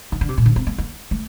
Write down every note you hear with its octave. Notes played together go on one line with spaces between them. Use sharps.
D#3
D3
C3
A#2
D3
C4
A#3
A#3
A3